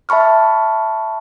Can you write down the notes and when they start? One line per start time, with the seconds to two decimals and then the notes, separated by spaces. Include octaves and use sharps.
0.09 E5 A5 B5 C#6 F6